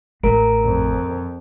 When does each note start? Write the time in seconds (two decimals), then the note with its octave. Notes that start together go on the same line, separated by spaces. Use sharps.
0.23 A1 A#4 A#5 D7
0.64 F2